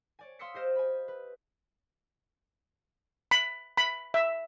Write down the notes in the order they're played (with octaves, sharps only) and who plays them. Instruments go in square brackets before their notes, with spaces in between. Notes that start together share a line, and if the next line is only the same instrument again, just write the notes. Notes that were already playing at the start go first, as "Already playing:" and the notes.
[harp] C#5 D5 G#5
F5 C6 D#6 E6 B6 C#7
G4 C5 D#5 F6 E7
G#5 B5
B4
[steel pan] B5
B5
E5